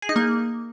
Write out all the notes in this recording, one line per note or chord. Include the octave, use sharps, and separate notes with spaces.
G#4
D#4
A#3